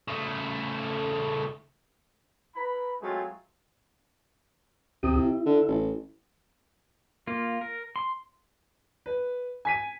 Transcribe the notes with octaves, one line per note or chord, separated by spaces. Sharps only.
C#3 A3
E4 B4 A#5 B5
F#3 G#3 A3 C4 F4 G#4
D2 C3 G4 D#6
E4
D3
A1
A#3 F4
A#4
C6
B4
G#5 B6 D#7